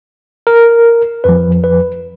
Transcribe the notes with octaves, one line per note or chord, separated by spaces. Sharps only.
A#4
F2 F3 B4
B4